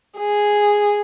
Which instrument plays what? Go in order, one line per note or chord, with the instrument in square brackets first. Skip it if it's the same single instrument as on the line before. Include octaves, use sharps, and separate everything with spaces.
[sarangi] G#4